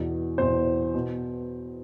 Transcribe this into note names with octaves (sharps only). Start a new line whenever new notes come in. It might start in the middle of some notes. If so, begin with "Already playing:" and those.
Already playing: E2 B2
E2 B2 C5
B2